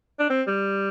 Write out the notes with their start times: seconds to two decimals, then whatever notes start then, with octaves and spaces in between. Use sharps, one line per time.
0.19 D4
0.30 C4
0.48 G3